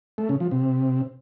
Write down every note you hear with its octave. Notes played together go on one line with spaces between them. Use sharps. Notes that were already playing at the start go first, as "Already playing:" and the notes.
A3
C#3
F3
C3